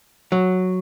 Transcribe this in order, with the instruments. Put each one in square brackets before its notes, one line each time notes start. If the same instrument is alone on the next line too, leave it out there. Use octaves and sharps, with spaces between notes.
[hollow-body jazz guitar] F#3